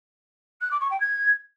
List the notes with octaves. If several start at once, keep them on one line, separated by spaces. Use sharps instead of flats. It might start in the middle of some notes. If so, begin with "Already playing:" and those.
F#6
D6
C#6
G5
G#6